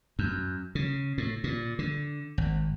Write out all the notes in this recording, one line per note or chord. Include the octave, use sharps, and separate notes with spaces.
F#2
C#3
A2
A#2
D3
G#1